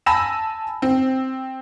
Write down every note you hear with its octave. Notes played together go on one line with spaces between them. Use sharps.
G#5 A5 B5 E6 A#6 E7
C4